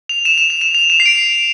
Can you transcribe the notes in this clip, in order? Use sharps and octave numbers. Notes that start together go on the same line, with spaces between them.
F7
E7
E7
F7
E7
F7
E7
C7
D7